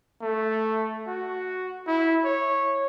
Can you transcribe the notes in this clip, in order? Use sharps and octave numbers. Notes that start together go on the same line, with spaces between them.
A3
F#4
E4
C#5